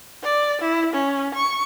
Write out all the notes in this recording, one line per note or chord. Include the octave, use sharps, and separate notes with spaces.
D5
E4
C#4
C#6